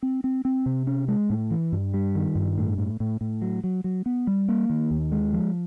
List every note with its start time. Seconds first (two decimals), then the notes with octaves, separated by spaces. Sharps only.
0.03 C4
0.24 C4
0.45 C4
0.66 C3
0.87 C#4
1.08 G#3
1.30 A2
1.51 E3
1.72 G2
1.94 G3
2.15 D#3
2.35 G2
2.58 A2
2.78 A2
3.00 A2
3.21 A2
3.42 F#3
3.64 F#3
3.84 F#3
4.06 B3
4.27 G3
4.48 A#3
4.70 D#3
4.91 D#2
5.12 G#3
5.33 F3